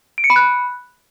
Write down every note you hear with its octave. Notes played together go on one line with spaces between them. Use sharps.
D7
C#7
B5
F#6